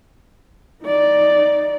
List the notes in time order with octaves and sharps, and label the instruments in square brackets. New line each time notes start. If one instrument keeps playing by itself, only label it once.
[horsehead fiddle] D#4 D5